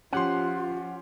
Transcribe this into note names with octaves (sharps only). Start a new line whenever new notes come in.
F3 C#4 F4 G4 F#5 C6